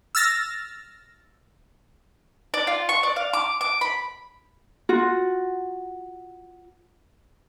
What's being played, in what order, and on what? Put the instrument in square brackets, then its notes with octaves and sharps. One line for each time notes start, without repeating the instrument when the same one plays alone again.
[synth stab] E6 F6 A6 A#6
[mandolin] D5
F4
C#6
D5
F5
D6
D6
B5
[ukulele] F4 F#4